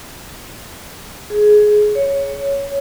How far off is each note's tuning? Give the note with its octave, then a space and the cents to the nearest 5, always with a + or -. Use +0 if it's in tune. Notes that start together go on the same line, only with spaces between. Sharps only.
G#4 +15
C#5 +10